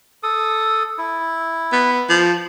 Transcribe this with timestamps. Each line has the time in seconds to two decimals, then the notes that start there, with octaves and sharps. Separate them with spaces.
0.23 A4 D#6
0.98 E4
1.72 B3
2.09 F3